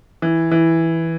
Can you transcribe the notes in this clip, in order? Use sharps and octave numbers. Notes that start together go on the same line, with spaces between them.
E3
E3